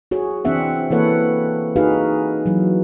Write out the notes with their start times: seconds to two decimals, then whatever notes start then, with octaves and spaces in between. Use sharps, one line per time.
0.11 F#4 G#4 C#5
0.45 E3 C4 D4 E5 F#5
0.91 E3 A#3 A4 B4 C#5 F#5
1.76 D#4 F#4 G#4 B4 F5
2.46 E3 F#3